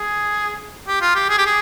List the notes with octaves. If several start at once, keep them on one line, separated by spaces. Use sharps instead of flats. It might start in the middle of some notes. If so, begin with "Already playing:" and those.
Already playing: G#4
G4
F4
G4
G#4
G4
G#4